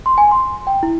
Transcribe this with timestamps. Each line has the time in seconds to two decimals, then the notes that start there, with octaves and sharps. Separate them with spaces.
0.06 C6
0.18 G#5
0.31 C6
0.67 G5
0.83 E4